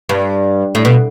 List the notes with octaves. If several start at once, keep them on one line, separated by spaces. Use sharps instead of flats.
G2
A2
B2